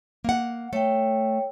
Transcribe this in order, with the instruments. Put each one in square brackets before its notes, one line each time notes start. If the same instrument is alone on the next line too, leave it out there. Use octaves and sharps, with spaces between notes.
[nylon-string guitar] A#3 F#5
[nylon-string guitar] A3 [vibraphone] C#5 G5